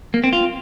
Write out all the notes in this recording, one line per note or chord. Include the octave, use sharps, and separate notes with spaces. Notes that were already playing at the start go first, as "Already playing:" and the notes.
A#3
C4
F4